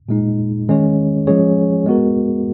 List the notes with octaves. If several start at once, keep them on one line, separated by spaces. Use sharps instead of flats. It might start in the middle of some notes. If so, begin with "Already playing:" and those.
A#2 G#3 D#4
D#3 G#3 C#4 G#4 C#5
F3 G#3 C#4 G#4 C#5
G#3 B3 F#4 A#4